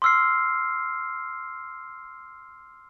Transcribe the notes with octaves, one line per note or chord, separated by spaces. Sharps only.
C6 D6 E6 F6 C7